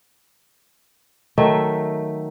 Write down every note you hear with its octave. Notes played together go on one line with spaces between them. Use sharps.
D#3 F#3 A3 E5